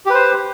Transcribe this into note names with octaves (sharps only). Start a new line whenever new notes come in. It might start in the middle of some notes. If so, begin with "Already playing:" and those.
G4 B4 C5